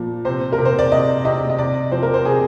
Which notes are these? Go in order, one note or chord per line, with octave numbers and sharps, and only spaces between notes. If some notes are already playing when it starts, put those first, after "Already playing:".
Already playing: A#2 F3
C3 C5
A#4
C3
C5
D5
C3 D#5
C3 D#5
D#5
C3 D5
F3 C5
A#4
C5
C3 G#4